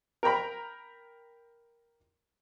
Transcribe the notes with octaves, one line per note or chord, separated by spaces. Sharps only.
A#4 G5 A#5 B5